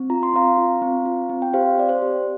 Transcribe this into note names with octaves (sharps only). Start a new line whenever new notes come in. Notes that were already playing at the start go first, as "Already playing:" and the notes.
Already playing: C4
F4 A#5
C6
C4 F5 A#5
F4
C4
F4
C4
G5
G4 C5 F5
C4 D5
C5
G4